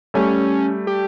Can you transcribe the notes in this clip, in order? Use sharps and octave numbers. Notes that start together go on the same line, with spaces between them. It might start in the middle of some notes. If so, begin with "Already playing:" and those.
G3 A3 C#4
G4